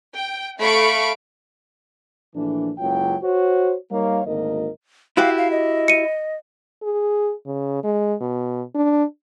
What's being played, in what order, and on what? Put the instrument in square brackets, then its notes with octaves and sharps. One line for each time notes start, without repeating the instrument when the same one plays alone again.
[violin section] G5
A3 F5 B5 C#6 D7
[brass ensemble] A#1 E3 A3 D4
F#1 C#2 F#3 F4 G5
F#4 C5 C#5
G3 A#3 D#4 A#4 C#5 F5
G#1 D2 G#2 A#3 A#4 D#5
[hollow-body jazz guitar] E4 F#4 G4 [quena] F5
[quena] F5
D#5
[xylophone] C#7 D#7
[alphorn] G#4
C#3
G#3
B2
D4